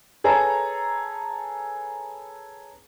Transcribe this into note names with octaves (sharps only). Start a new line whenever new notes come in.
G#4 A4 B4 C#5 A#5